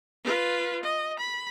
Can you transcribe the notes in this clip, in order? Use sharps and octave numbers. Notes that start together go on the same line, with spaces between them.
F4 B4
D#5
B5